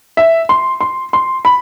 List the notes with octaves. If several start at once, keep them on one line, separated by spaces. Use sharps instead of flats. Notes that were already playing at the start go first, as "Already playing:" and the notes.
E5
C6
C6
C6
B5